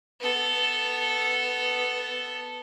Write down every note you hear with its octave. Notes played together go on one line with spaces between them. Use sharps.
B3 A4